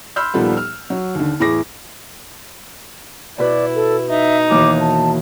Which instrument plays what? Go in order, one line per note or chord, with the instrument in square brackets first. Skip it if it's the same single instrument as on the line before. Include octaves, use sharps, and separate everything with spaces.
[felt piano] B5 C6 E6 F6 G6
D#2 A#2 F3 G3 B3 A4
F6
F#3
D#2 D3
E2 A2 E4 G#4 D6 A#6
[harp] B2 B4 [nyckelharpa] E4 [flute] D5
[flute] A4
[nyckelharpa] D#4 [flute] E5
[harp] D#2 B2 E3 [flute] D6
[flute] A5